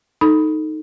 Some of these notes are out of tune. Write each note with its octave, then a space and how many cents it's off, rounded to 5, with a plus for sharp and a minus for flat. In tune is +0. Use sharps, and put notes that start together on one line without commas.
D#4 +0 A4 +0 B5 +0